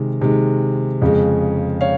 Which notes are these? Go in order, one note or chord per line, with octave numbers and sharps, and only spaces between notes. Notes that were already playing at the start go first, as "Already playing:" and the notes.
Already playing: C3 D#3 G#3
C3 D#3 G#3
F2 C#3 G#3
C#5 F5